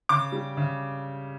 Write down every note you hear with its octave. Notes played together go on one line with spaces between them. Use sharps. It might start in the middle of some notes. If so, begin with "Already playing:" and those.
C#3 D6
G3
C#3